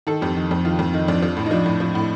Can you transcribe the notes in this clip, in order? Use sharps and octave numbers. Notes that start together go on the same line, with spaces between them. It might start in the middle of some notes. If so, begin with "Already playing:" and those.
D#3 A4
F2 G4
D#3
F2
D#3 F4
F2
D#3 D#4
F2 D4
F3
A2
D#4
F3 D4
A2
F3
A2